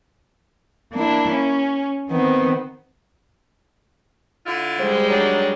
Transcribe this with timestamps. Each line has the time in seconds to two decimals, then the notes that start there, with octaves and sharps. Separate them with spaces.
0.93 A#3 D4 E4
1.32 C#4
2.10 D#3 B3 C4
4.45 D3 E4 F4
4.79 G3 G#3 C5
5.09 D#3 F#3 D4